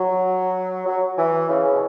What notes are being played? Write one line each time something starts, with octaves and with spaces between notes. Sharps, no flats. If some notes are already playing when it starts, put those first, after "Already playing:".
Already playing: F#3
F#3
E3
C#3
B2